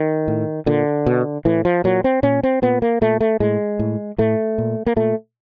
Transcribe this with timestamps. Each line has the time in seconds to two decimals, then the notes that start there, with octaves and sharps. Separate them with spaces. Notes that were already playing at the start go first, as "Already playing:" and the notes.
Already playing: D#3
0.28 A2
0.66 A#2 D3
1.06 B2
1.45 A2 E3
1.65 F3
1.84 A#2 F#3
2.04 C4
2.23 A#2 C#4
2.43 C4
2.62 A#2 B3
2.82 A#3
3.01 A#2 A3
3.21 A3
3.40 A2 G#3
3.79 A2
4.18 A2 A3
4.58 A#2
4.86 A#3
4.96 A#2 A3